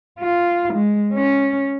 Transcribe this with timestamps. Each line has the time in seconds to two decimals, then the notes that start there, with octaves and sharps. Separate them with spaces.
0.20 F4
0.74 G#3
1.13 C#4